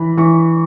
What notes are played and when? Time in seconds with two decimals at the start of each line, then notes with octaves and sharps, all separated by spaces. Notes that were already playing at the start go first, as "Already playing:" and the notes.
Already playing: E3 B5
0.17 E3 C#6